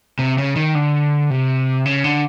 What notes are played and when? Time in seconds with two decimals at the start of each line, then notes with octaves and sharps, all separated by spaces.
0.19 C3
0.38 C#3
0.56 D#3
0.75 D3
1.30 C3
1.86 C#3
2.04 D3